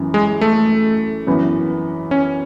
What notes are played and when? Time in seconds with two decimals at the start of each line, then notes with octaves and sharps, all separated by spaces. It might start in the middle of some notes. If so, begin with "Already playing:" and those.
Already playing: F#2 E3 B3
0.14 G#3
0.41 A3
1.27 F#2 E3 B3
2.11 C#4